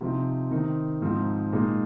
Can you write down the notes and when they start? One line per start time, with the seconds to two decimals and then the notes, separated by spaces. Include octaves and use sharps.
0.01 C3 F3 C4 D#4
0.51 D#3 C4 D#4
1.02 G#2 F3 C4 D#4
1.52 A#2 G#3 D#4